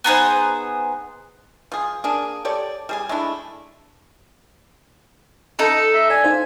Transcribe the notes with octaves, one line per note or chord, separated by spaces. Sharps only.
B3 D#4 G#4 C5
F3 G#4
A#3 D4 G#4
G4 A4 C#5 D5
G3 G#4 G#5
G#3 A3 D4 E4
D#4 A4
E5
D5 G#5
D#4 C5 F5